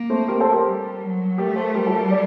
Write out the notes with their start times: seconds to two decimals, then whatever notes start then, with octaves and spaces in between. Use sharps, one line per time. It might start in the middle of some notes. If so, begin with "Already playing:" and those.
Already playing: A#3
0.10 A3 C4
0.28 G4 A#4
0.40 A4 C5
0.52 G4 A#4
0.65 G3
1.02 F#3
1.38 A3 G4 A#4
1.56 A4 C5
1.75 G3 G4 A#4
1.87 F#4 A4
1.99 G4 A#4
2.11 D5